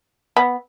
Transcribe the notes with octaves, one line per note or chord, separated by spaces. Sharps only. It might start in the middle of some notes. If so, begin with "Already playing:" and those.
B3